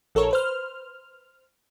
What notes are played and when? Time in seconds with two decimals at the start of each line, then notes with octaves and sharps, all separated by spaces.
0.15 A#1 A4 A#4 C#5
0.31 B4 C5 F6